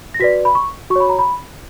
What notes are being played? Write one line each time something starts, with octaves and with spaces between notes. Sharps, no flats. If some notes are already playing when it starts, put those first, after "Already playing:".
A#6
F#4 B4 D5 B6
B5
C#6
F#4 C#6
C#5 B5
A#5
B5